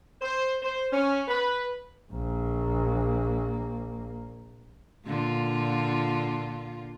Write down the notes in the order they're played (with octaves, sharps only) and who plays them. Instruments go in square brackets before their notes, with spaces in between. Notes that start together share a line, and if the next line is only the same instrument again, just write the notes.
[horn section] C5
C5
C#4
B4
[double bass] A#1 A#3
[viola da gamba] A#2 D3 F4